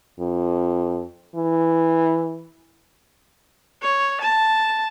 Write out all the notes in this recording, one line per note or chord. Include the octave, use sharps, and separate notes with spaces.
F2
E3
C#5
A5